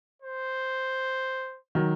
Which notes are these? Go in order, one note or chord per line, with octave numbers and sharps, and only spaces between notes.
C5
D#3 F#3